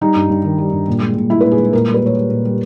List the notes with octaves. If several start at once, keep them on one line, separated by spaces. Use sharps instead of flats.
G3 D#4
G2
G2
D#3
G3
G2
A#2
G#3
A#2
G#3 E4
B4
A#2
G#4
G#3
A#2 A#4
G3
B4
A#2 C#5
G3
A#2
G3